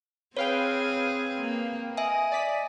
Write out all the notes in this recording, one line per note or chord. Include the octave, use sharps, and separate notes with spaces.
C4 G#4 B4 C#5 F5 G5
A#3
D#5 E5 G#5 D#6
D5 B6